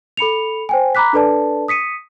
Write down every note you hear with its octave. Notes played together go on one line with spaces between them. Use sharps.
A4 B5 C#7 F7
C5 G5 G#5
A#5 B5 D6 F#6 B6
D4 A4 B4 D5 A5
D#6 B6 C#7 D#7